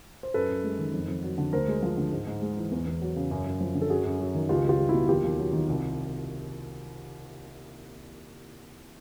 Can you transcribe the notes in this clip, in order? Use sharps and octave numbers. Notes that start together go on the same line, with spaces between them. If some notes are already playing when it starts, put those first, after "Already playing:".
C5
F#2 A4 B4
F#2
G#3
D#3
F2
F2
F#3
D3
D2 A#4 C5
G#3
F3
D3
G#2
G#2
G#3
E3
E2
E2
F#3
C#3
F#2
F#2
F3
D3
A4
F#2 F#4 G#4
F#2
F#3
D#3
C#2 F4 G4
C#2 F4 G4
G3
E4 F#4
B2
D#2 F4 G4
D#2
F#3
D#3
C2